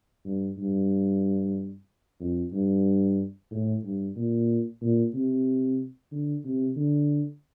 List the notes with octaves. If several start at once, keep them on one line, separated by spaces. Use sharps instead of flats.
G2
G2
F2
G2
A2
G2
A#2
A#2
C3
D3
C3
D3